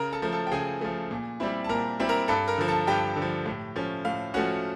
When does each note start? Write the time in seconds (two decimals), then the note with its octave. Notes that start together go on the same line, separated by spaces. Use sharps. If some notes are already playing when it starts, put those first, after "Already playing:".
Already playing: C#3 A#4 A#5
0.13 A4 A5
0.22 F3 A3
0.32 A4 A5
0.47 G5
0.51 C#3 G#4 G#5
0.81 F3 A3
1.11 A#2
1.40 G3 C4 E4
1.64 A5
1.69 A#2 A#4 A#5
2.00 G3 C4 E4
2.09 A#4 A#5
2.28 G2 A4 A5
2.48 A#4 A#5
2.58 D3 F3
2.68 A4 A5
2.87 G2 G4 G5
3.16 D3
3.22 F3
3.46 A2
3.76 F3 A3 C#4
4.05 A2 F5
4.34 F3 A3 C#4 F#4 F#5